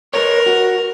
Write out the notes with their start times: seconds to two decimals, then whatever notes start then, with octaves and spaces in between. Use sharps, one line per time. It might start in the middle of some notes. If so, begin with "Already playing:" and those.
0.14 A#4 B4 C#5
0.46 F#4